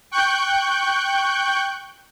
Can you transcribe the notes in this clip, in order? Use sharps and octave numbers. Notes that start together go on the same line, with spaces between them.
G5 C#6 F#6 G6